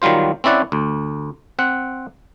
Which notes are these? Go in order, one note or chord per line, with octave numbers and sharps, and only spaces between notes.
D#3 F#3 G3 F4 C5
C4 C#4 E4 D5 F#5
D2
C4 F#5